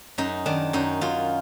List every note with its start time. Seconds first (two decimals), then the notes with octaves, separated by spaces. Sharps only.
0.18 F#2 D#4
0.46 D#3 D4
0.73 F#2 D#4
1.01 F#2 F4